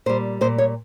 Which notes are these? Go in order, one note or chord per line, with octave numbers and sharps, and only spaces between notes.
A#2 G3 C5
A#2 G3 C5
C#5